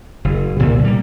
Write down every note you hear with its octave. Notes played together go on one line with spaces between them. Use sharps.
F#1
C2 A#2 D3
G3 A#3